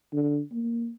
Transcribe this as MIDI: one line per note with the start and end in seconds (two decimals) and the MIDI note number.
0.13 0.41 50
0.52 0.91 58